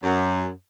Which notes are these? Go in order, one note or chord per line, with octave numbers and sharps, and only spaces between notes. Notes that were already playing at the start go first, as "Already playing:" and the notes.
F#2